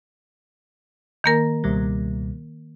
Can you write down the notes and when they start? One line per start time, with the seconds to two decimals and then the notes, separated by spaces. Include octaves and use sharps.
1.24 D#3 A#3 A#4
1.64 C#2 B2 G3